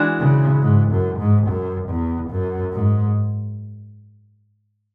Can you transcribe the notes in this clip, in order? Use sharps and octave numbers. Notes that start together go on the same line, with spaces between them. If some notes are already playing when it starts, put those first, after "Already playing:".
Already playing: E3 G#3 D4 F#4
C#3
G#2
F#2
G#2
F#2
E2
F#2
G#2